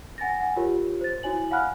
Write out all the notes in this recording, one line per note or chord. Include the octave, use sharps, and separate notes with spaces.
F#5 G#5 A6 A#6
F#5 G#5
F4 G4 A#4 C#5
C5 A6
E4 F#4 C#5 G#5 F#7
F5 F#5 G#5 B5 F6 F#6